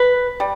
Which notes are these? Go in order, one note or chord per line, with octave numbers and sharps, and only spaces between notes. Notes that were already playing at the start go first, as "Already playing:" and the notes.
Already playing: B4
G3